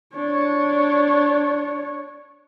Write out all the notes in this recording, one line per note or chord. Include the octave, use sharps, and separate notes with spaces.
D4 C#5